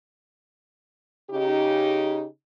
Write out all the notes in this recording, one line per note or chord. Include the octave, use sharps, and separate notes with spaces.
C#3 D#4 G4